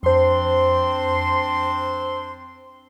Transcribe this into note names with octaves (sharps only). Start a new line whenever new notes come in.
F2 C4 D4 C5 C6